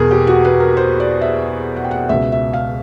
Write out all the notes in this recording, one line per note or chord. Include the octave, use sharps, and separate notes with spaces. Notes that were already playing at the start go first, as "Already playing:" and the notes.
Already playing: E2 B2 G#4 A#4
G4
F#4
B4
A#4
C5
D5
E5
F#5
G5
F#5
C#2 B2 E5
E5
F5